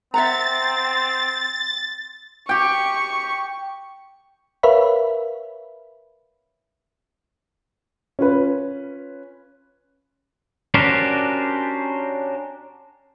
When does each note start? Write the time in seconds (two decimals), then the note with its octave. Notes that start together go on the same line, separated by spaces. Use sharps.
0.14 C4 E5 F#5 A#5 A6
2.49 G4 G5 C#6
4.63 A#4 B4 C#5 E5 F5 B5
8.19 C#4 F4 B4
10.74 C#4 D4 F#4 G4 A#4 C5